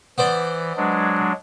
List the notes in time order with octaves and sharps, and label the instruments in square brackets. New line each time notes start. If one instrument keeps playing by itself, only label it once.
[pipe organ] E3 [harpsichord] B3 C5 D5
[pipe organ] F#3 G#3 D4